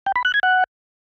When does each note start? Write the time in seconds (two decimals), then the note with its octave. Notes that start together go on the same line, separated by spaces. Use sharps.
0.06 G5
0.16 B5
0.25 F#6
0.34 G#6
0.43 F#5